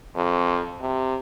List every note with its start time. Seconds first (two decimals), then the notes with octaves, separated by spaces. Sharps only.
0.16 F2
0.81 C3